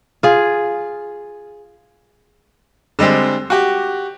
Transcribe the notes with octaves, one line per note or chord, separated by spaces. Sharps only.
F4 G#4
D3 G3 G#3 C4
F#4 G4